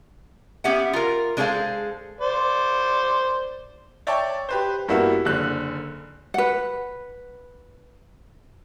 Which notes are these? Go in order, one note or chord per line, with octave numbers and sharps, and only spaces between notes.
B3 C#4 G4 E5 F#5
F4 A#4
G#3 D4 G#4 A4 C5 F5
C5 D5
C#5 D5 E5 G5 A5 C#6
G4 B4 C5
G2 G3 A#3 B3 E4 F#4
F#1 D3 F#6
B4 F#5